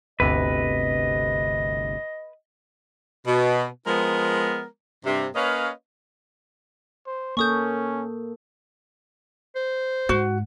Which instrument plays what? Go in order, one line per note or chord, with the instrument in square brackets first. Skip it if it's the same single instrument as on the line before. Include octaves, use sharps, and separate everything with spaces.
[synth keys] G1 D2 C3 [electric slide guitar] B4 [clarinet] D#5
[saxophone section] B2
F3 G#3 B3 A#4
G2 C3
A#3 C#4 B4 C#5 D#5 F5
[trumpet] C5
[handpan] A#3 A4 [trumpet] C#4 [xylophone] C#6 D#6 G6
[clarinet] C5
[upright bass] G#2 [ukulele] F#4